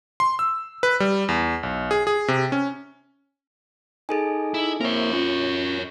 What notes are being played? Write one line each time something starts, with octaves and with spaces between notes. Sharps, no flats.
C6
E6
B4
G3
E2
B1
G#4
G#4
C3
C#4
D#4 G#4 A4 G#5
E4
A#3 C4 E4 A#4 C#5
C#4 F4